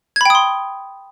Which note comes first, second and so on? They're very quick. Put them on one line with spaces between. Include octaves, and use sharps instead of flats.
G#6 B5 G5 D#6 C6